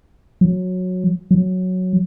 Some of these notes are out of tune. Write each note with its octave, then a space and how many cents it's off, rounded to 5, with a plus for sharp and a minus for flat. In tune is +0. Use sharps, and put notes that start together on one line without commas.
F#3 -15
F#3 -5